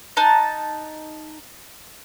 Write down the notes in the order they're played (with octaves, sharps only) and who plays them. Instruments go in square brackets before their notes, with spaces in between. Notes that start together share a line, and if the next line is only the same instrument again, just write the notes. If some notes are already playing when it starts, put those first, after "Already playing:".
[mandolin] D#4 A5 F#6